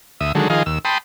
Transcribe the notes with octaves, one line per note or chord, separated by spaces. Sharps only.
D2 E5 D#6
D3 D#3 F#3 G#3 A4
D#3 F3 G#4 D#5 F5
D#2 E6
G5 A5 B5 C6 D#6